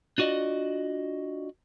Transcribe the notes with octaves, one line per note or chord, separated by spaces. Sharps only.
D4 F4 F#4 D5 D#5